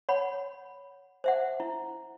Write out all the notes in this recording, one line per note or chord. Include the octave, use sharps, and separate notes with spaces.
C#5 F#5 B5
C5 E5 F#5
E4